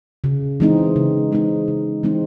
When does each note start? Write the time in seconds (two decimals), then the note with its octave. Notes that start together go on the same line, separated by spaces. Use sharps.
0.24 C#3
0.60 E3 G#3 C4 D#4
0.96 C#3
1.32 E3 G#3 C4 D#4
1.68 C#3
2.03 E3 G#3 C4 D#4